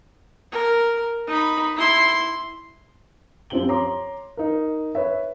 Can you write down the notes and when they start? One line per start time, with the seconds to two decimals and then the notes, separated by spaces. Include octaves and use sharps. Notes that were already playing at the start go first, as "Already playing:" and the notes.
0.52 A#4
1.28 D#4 B5
1.76 E4 C6
3.50 F#2 F3 C4 G4 F#7 G7
3.68 C#5 A#5 C6 D6
4.37 D#4 A#4
4.95 B4 C#5 E5